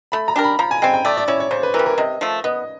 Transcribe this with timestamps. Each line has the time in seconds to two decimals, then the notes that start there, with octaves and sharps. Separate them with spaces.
0.12 A3 B5
0.28 A#5
0.36 D4 G4 A#4
0.44 B5
0.59 F3 A#5
0.71 G#5
0.82 G#3 C4 G5
0.94 G5
1.05 A3 D5
1.17 D5
1.28 C#4 E4 C#5
1.40 C#5
1.51 C#3 C5
1.63 B4
1.74 E3 A#4
1.79 G3
1.86 A#4
1.98 C3 D#5
2.21 F3 A3
2.44 B3 D#5